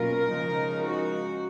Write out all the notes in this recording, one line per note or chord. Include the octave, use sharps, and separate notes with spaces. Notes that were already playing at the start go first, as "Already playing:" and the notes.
Already playing: B2 F#3 A#3 C#4 F4 A#4
C#3 F3 G#3 D#4
F#4